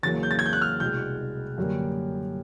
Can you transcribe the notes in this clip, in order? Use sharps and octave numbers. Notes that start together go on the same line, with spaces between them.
E2 C#3 F#3 A#3 A6
G6
A6
G#6
G6
F#6
F6
C2 B2 G#3 G6
F#2 D3 G3 A#3